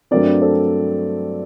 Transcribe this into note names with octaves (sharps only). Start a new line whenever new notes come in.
G2 F#3 A3 C4 A#4 D5
A4 C5